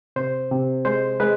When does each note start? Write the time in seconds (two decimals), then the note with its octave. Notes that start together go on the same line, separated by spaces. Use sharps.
0.16 C3 C5
0.51 C3
0.85 G#3 C5
1.20 G#3 B4